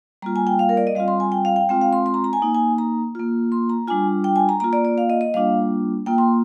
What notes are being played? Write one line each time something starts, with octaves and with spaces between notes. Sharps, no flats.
G3 A#3 F4 A#5
G#5
G5
F5
A#4
D5
D#5
G3 C4 F4 F5
C6
G#5
G5
F5
G5
G#3 C4 F4 G5
F5
C6
C6
A#5
A#5
G#5
A#3 D#4
G#5
A#5
A#3 F4
C6
A#5
G3 D4 F4 G#5
G5
G#5
A#5
A#3 F4 A#5
D5
D5
F5
D#5
D#5
G3 A#3 D4 F4 F5
A#3 F4 G5
C6